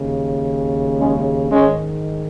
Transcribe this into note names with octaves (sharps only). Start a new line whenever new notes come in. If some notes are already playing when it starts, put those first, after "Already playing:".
Already playing: D#2 C#3
G#3 C#4
G#2 D#3 G#3 C#4